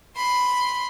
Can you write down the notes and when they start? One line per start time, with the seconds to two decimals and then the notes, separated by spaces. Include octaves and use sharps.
0.16 B5 C6